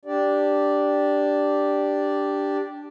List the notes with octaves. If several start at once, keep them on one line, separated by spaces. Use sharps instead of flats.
D4 G4 D5